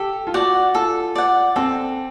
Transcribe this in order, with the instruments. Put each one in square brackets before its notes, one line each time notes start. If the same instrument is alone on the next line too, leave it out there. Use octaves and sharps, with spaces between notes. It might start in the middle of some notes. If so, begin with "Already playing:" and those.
Already playing: [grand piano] G4 [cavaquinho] A4
[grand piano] F4
[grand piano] F#4 [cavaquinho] D5 F#5
[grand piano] F4 [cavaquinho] A4
[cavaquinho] D5 F#5
[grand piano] C4 [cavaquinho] A4